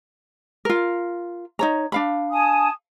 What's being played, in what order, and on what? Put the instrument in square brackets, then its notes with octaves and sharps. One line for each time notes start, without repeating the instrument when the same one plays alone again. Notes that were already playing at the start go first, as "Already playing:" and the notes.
[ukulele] F4 A#4
D#4 C#5 A#5
D4 F5 B5
[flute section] G#5 A5 D#6